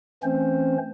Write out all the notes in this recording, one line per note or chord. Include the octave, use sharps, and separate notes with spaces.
E3 A3 C4 C#4 C5